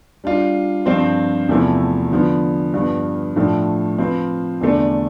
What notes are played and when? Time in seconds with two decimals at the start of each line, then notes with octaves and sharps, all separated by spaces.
0.24 G3 D4 F4
0.86 G2 F3 C4 F4 C5
1.49 E2 C3 F3 A3 E4
2.11 D3 F3 B3
2.73 G2 F3 B3
3.36 A2 F3 A3 D4
3.98 F3 C4 F4 B4
4.61 E2 D3 A3 D4